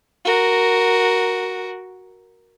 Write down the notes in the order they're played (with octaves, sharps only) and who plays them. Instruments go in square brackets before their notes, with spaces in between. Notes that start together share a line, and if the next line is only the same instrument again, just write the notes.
[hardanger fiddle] F#4 A#4